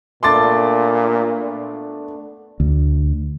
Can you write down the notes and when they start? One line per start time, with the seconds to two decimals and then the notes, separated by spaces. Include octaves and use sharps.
0.23 A#2 A3 B3 D4 C6 D6 A6
2.60 D2